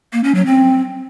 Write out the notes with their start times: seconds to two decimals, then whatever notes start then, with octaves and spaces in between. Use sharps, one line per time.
0.13 A#3
0.24 C#4
0.35 F#3
0.46 C4